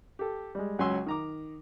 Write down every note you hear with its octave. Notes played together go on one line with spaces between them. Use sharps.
G4 A4
G3 G#3
C#2 F#3 C#4 G#5 C6 E6
D#3 A#5 D6